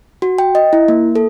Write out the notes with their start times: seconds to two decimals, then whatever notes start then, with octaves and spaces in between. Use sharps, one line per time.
0.22 F#4
0.38 G5
0.55 D#5
0.73 E4
0.88 A#3
1.16 A4